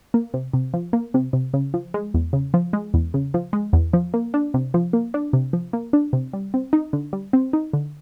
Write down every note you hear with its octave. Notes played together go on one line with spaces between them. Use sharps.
A#3
C3
C3
F3
A#3
C3
C3
C#3
F3
G#3
E2
C#3
F3
G#3
E2
C#3
F3
G#3
E2
F3
A#3
D4
C3
F3
A#3
D4
C3
F3
A#3
D4
C3
G3
C4
D#4
D3
G3
C4
D#4
D3